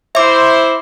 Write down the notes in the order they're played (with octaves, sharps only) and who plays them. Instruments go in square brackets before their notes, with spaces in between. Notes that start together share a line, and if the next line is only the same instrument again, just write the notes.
[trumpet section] E4 C5 [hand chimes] E5 D6